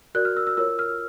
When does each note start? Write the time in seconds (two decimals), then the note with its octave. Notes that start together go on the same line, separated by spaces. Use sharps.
0.15 F#4 A#4 D5 F#6
0.25 F6
0.37 E6
0.47 E6
0.57 F4 A#4 C#5 E6
0.79 F6